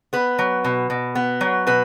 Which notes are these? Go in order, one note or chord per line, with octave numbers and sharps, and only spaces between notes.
B3 B4
F#3
B2
B2
B3
F#3
B2 B4